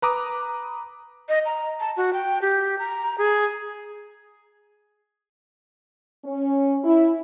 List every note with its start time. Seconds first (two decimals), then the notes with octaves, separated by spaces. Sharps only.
0.02 B4 A#5 D6 D#6
1.29 D#5
1.46 A#5
1.80 A5
1.97 F#4
2.13 G5
2.42 G4
2.79 A#5
3.18 G#4
6.24 C#4
6.84 E4